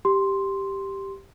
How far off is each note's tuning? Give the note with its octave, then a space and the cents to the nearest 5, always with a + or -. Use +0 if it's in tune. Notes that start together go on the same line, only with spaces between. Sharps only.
G4 +0 C6 +0